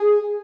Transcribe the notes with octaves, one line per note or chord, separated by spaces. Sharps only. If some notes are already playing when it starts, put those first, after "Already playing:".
Already playing: G#4